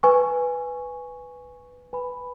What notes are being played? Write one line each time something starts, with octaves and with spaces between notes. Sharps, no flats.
B4 G#5 C#6
B4 G#5 B5